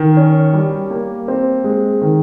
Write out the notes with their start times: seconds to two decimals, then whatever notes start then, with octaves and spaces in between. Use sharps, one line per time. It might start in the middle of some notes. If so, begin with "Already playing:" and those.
Already playing: D#3
0.17 C#4
0.53 G3
0.90 A#3
1.28 C4
1.64 G#3
2.01 D#3